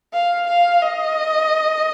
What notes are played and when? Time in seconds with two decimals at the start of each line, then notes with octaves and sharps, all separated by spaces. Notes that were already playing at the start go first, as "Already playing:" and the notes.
0.13 F5
0.47 F5
0.81 D#5